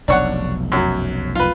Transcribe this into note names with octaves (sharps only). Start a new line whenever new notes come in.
F1 B1 D4 C#5 F#5
F#2 F#3
F4 B4